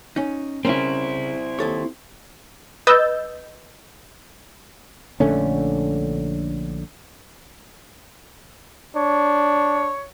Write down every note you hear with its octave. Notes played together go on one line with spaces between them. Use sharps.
C#4 D#4
C#3 C4 C#4 E4 A#4
D#2 A4 C#5
B4 D#5 E6 G6 A6
A#1 D3 A3 C#4
D4 C#5